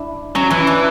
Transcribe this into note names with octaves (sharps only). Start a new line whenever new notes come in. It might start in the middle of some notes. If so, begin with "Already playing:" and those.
Already playing: D4 E4
F#3 C#4
E3 C#4
D4